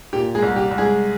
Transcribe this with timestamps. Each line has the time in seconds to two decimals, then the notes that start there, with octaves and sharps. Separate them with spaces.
0.13 A#2 G4
0.34 G#3 G#4
0.42 C2
0.56 G4
0.71 C2
0.78 G#3 G#4